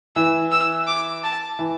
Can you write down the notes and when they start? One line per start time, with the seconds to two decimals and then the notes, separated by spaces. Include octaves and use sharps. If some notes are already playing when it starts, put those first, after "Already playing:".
0.16 E3 E6
0.52 E6
0.87 D6
1.23 A5
1.59 E3